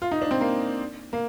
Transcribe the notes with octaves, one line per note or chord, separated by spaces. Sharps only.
F4
D#4
D4
C4
A#3
A#3